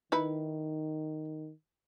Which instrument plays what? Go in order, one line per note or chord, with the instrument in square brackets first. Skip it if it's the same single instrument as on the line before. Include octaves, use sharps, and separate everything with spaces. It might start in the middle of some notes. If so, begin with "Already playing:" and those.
[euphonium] D#3 [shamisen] D#4 E4 B4